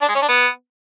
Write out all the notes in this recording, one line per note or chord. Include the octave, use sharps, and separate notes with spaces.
D4
G#3
C#4
D4
B3